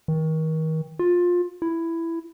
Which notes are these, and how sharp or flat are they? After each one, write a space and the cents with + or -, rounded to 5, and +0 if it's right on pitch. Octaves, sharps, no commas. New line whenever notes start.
D#3 +35
F4 +20
E4 +10